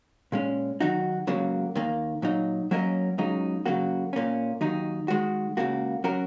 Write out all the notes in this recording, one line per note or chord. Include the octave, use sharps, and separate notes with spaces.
A#2 G#3 C#4
D#3 F#3 D#4 F#4
C#2 C#3 F#3 A#3
D#2 D#3 A#3
A#2 F#3 D#4
F#3 A#3 C#4 A#4 D#5
C#2 C#3 F#3 D#4
C#3 F#3 A#3 F#4
A#2 A#3 C#4
D#2 D#3 F#3 D#4
D#3 G#3 F#4
C#2 C#3 A#3 F#4
F#3 C#4 F#4 A#4